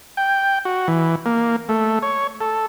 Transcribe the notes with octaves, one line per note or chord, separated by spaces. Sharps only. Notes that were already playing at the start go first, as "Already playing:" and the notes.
G5
F#4
E3
A#3
A3
C#5
A4